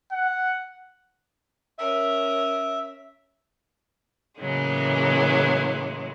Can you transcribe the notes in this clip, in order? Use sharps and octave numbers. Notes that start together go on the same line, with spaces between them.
F#5
C#4 A#4 E5
A2 C#3 E3 F#3 G#3 A#3